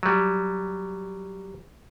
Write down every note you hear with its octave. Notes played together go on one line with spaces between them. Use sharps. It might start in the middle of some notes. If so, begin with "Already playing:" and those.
F#3 G3